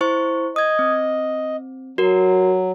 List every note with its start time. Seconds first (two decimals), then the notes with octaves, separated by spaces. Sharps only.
0.01 E4 C5 C#6
0.56 D#5 D#6 G#6
0.79 C4
1.98 F#3 F#4 A#4